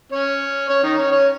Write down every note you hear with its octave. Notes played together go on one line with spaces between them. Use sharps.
C#4 C#5
C#4 C#5
D#3 D#4
C#4 C#5
C#4 C#5